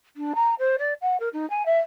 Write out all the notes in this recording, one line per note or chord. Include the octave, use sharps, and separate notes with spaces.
D4
A#5
C5
D5
F#5
A#4
D#4
G#5
E5